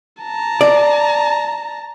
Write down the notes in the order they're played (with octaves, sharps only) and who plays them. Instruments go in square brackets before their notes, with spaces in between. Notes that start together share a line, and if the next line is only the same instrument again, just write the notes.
[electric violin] A5 A#5
[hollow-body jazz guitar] D5